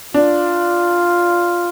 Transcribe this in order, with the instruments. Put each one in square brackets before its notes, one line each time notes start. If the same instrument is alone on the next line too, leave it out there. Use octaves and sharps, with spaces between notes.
[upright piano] D4 [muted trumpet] F4